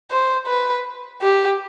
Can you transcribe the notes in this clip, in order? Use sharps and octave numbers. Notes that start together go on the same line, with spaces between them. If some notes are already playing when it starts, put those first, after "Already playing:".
C5
B4
G4